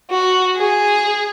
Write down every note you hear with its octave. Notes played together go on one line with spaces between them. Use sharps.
F#4
G#4